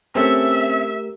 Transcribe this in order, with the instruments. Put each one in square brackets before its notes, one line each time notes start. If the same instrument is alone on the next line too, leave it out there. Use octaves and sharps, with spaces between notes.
[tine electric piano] A3 G4 A#4 [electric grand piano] C4 C#4 A4 [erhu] E5